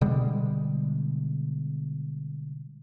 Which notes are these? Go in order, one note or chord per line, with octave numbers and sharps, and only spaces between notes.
B2 D3 G3 G#3